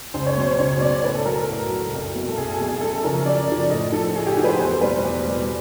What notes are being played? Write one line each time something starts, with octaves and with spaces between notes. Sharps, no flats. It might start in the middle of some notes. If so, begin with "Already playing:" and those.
C#2 C5
C#5
B2 F#3 C5
C5
C#2 C#5
B2 F#3 D5
A2 B4
A4
F#3 A#4
A4
A2
F#3
C2
B2 F#3
A4
C2 G#4
A4
B2 F#3 G#4
F#2 A4
A4
C#3 F3 A#4
F#2 D5
C#3 F3
A2 D#5
F3 A4
A2 G#4
G4
F3 F#4
B4
C5
E2 C5
B2 G3 B4
E2
B2 G3